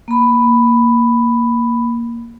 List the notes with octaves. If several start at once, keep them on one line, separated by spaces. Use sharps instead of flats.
A#3 B5